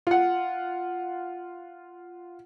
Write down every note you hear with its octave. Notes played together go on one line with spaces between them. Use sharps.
F4 F#5